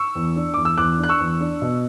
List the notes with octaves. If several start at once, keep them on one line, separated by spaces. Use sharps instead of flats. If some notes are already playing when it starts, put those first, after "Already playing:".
Already playing: C#6 E6
E2
D4
E2 D6
E6
E2 D6 F#6
D4 F#6
C#6 E6
E2
D4
B2